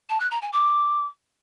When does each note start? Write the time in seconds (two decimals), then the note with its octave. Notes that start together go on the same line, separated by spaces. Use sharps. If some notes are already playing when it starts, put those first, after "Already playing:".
0.10 A5
0.20 F#6
0.31 A#5
0.42 G#5
0.53 D6